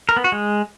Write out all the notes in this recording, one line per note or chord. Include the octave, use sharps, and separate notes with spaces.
A#4
B3
F#4
G#3